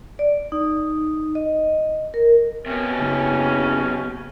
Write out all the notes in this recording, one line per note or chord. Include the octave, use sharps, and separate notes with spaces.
D5
D#4
D#5
A#4
C3 B3 C#4
F#1 C#3